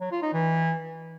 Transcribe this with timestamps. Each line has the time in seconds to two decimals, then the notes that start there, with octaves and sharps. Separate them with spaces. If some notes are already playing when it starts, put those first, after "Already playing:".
0.01 F#3
0.11 F4
0.22 D#4
0.33 E3